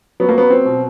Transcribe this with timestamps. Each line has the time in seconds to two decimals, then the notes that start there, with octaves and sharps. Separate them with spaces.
0.20 F#3 B3
0.29 A#3
0.38 B3
0.50 C4
0.65 B2